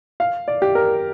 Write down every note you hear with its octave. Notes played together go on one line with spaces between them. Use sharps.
F5
D5
G4
A#4